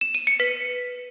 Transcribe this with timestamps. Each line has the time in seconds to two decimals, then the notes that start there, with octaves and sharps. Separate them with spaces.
0.01 E7
0.15 D#7
0.27 C#7
0.40 B4 B6